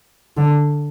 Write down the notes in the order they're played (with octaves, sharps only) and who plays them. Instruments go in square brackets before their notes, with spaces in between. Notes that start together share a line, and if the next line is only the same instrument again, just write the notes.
[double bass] D3